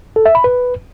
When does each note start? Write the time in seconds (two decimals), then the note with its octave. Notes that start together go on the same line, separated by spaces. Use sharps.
0.16 A4
0.26 E5
0.35 B5
0.44 B4